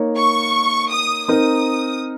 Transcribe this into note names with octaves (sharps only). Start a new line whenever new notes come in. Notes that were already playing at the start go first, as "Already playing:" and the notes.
Already playing: A#3 D#4 A#4 C#5
C#6
D#6
C4 D#4 A#4 D#6